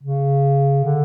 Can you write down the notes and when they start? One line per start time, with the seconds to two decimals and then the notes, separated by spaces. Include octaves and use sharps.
0.03 C#3
0.85 D3